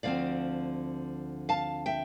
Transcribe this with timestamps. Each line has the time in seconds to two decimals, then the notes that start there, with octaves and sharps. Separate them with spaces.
0.03 D2 D3 F3 C4 D5 F5
1.49 F5 A5
1.86 E5 G5